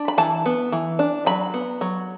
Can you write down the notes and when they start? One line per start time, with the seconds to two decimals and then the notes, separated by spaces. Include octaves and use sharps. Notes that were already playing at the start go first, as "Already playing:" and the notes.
Already playing: D4
0.08 B5
0.18 E3 A5
0.46 B3
0.72 E3
0.99 D4
1.26 F#3 B5
1.54 B3
1.81 F#3